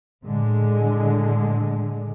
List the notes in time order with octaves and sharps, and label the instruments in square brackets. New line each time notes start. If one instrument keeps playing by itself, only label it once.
[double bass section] A2 D3 G#3